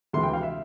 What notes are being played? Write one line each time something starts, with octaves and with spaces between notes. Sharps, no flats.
D2 C3 E3 G#3 C6
G5
F5
E5